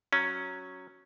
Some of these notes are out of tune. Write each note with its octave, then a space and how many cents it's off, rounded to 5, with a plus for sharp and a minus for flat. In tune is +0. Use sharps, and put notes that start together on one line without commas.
F#3 +0 C#4 +0